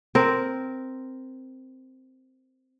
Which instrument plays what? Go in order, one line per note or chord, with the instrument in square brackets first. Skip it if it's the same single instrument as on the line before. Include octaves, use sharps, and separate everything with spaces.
[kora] C4 A#4